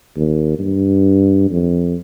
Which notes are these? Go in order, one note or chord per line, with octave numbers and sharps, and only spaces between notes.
D#2
G2
F2